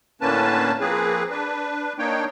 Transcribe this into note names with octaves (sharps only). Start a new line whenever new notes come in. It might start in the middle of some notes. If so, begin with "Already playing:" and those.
A2 D3 A#3 C#4 B4 A5
F3 A#3 C4 G#4 B4
D4 B4
A#3 D4 D#4 C#5 G5